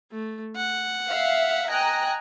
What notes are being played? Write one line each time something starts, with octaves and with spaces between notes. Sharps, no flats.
A3
F#5
E5 F5
D#5 G5 G#5 A#5 F#6